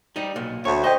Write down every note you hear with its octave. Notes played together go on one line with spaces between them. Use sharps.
G3 D#4
B1 A#2
D2 A3 C#5
G4 C5 D#5